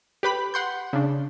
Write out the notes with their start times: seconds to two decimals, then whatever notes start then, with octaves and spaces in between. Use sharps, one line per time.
0.23 G4 B4 B5 B6
0.54 F#5 C6 G6
0.93 C#3 D4